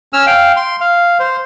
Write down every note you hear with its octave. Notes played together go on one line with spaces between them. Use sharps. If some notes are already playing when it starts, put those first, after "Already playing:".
C#4 E6 F6
F5 G5
C6
F5
C5